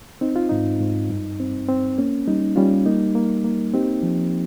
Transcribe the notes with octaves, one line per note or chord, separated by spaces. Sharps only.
C4 D#4
F4
G#2 D#4
G#2
G2
C4
C4
A#3 C#4
G3 D#4
G3 C#4 F4
A#3 D#4
A#3
A#3
C4 D#4 G4
F3